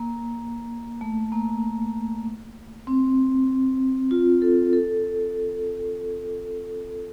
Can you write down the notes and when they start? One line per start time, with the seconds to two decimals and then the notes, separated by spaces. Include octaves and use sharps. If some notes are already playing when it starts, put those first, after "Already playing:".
Already playing: A#3
1.01 A3
1.32 A#3
2.87 C4
4.11 F4
4.42 A4
4.73 A4